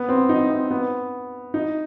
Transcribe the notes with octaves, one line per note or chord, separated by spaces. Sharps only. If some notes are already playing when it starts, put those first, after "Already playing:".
Already playing: B3
C4
D#4
C4
B3
D#4